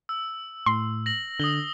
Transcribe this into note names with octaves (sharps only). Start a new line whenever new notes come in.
E6
A2 C6
A#6 F#7
D3 D#6 F#7 G7